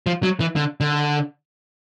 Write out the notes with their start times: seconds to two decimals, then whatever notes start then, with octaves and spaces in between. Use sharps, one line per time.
0.07 F3
0.23 F#3
0.40 E3
0.56 D3
0.80 D3